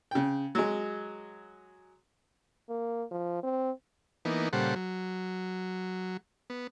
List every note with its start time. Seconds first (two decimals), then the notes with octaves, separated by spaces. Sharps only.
0.11 C#3 G5
0.55 F#3 G#3
2.69 A#3
3.11 F3
3.43 C4
4.25 E3 A#3 B3 D#4
4.53 A#2 C#3 G3 A4 C5 F#5
4.76 F#3
6.50 B3